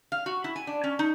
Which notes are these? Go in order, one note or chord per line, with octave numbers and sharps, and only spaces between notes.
F5
F#4
E4
G#5
D4
C#4
D#4